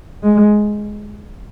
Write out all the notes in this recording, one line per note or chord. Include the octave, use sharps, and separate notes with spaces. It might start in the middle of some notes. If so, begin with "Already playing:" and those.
G#3